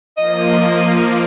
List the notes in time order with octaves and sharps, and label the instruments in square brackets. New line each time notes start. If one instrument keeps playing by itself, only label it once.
[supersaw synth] F3 A#3 [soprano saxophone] D#5